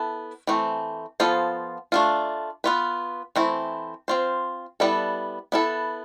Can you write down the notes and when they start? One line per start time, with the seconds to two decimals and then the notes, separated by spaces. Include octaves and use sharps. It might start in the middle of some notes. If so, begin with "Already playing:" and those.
Already playing: B3 E4 A4
0.47 E3 A3 C4
1.20 F3 B3 F4 A4 C5
1.92 A3 D4 F4
2.64 B3 F4 B4
3.36 E3 A3 C4 E4
4.08 C4 F4 C5
4.80 G3 B3 E4 A4
5.52 B3 E4 A4